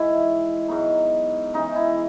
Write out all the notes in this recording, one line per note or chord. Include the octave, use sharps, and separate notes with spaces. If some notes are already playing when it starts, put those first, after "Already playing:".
Already playing: G#2 E3 G#3 E4
G#2 F#3 B3 D#4
C#3 E3 G#3 D#4
E4